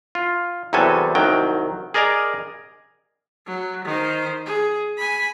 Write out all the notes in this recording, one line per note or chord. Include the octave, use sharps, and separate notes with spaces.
F4
E2 C3 F#3 G3 A4 G#5
C2 D#3 F#3 G5
G#4 A#4 D5 D#5 G#5 A#5
F#3
D#3 C5
G#4
G#5 B5